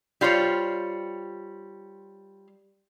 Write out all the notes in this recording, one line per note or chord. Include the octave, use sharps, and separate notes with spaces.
G3 F4 C5 C#5